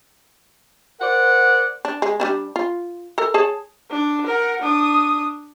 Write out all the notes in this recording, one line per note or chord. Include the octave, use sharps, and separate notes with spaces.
A#4 C5 D5 F#5
D4
G#3
G3 C#4 D4
F4
A4 A#4
G#4 C#5 A5
D4
A#4 F#5
D4 D#6